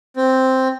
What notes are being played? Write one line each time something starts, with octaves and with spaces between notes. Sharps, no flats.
C4